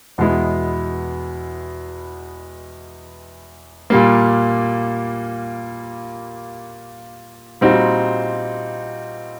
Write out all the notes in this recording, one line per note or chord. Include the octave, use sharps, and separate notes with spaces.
E2 B2 G#3 B3 E4
A#2 G3 A#3
A#2 G3 C4 D#4 F#4